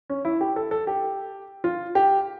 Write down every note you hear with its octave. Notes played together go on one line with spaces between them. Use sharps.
C#4
E4
G4
A4
A4
G4
F4
G4